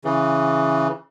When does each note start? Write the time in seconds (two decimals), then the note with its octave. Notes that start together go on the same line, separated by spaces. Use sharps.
0.05 C#3 E3